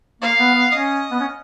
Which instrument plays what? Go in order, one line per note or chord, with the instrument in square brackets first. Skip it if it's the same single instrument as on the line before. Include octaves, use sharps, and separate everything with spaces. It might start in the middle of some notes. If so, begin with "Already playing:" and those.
[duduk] A#3 [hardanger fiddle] F5
[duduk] B3
B3
[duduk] C#4 [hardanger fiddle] D#5
[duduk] B3
C#4